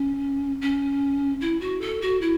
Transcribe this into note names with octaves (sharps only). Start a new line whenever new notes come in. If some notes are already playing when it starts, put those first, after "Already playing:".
Already playing: C#4
C#4
E4
F#4
A4
F#4
E4